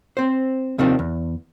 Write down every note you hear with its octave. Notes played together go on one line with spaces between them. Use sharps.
C4 C5
D#2 C3 D#3 F3 C4 D4
E2